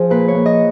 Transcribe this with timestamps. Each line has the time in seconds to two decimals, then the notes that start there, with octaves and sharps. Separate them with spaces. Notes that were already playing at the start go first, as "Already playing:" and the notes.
Already playing: F3 G#4
0.10 A#2 B4
0.28 C#5
0.34 A#2
0.46 D#5